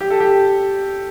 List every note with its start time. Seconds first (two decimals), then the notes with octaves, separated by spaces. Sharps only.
0.01 G4
0.10 A4
0.20 G4